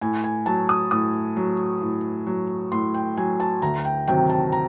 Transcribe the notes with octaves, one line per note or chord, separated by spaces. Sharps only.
A2 G#5
G#5
F#3 A5
D#6
A2 D#6
F#3
A2
F#3
A2 C6
G5
F#3 G#5
A5
D2 A#5
G5
C3 D#3 F#3 G5
A5
A#5